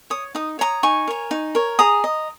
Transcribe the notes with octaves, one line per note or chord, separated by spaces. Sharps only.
C#5 D#6
D#4 D#6
C#5 A#5 D#6
D#4 G#5 C#6
A#4 C#5
D#4
A#4 C#5
G#4 A#5 D#6
D#5